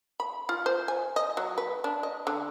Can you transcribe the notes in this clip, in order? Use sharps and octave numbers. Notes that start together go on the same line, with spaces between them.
B5
F4
C5
G#5
D#5
F#3
B4
D4
D#5
D3